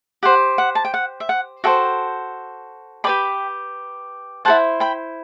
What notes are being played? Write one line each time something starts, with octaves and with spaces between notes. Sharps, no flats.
G4 C5 F#5
F#5
A5
G5
F#5
E5
F#5
F#4 A4 C5 E5 G5
G4 B4 D5 G5 B5
E4 A4 C5 F#5 A5
G5 B5